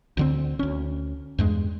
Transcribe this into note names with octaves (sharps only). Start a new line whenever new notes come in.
D2 D3 C4
D2 C#4
E2 G2 G#3